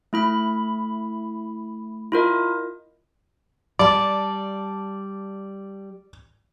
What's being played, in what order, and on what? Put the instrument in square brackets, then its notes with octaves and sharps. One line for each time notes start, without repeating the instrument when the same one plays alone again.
[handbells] A3 E4 B5
E4 F4 A#4 D#5
[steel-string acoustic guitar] G3 A5 [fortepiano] D5